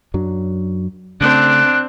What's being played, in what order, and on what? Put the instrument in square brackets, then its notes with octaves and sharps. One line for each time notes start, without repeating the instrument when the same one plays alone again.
[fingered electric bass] F#2 F#3 D4
[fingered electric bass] C#3 A3 [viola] C4 D4 [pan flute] F#6